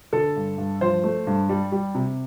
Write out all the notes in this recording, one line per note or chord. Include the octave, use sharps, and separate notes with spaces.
D3 A4
G2
G2
F3 C5
A3
G2
G3
G3
C3